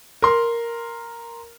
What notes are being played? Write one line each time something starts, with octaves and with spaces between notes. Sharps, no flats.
A#4 C6